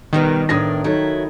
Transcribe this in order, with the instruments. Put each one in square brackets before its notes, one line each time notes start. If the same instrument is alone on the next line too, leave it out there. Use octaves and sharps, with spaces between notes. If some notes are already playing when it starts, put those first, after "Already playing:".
[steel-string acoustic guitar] B2 G3 B3 [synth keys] D#3
[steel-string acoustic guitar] E2 A2 D4 [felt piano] D#6 G#6 A#6
[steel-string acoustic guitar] F#3 E4 [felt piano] D#4 A4